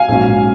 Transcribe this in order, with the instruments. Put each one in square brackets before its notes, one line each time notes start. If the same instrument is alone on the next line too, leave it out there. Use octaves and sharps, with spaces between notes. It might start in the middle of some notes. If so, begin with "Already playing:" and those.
Already playing: [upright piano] F5 G#5
A#1 G#2 F#3 C#4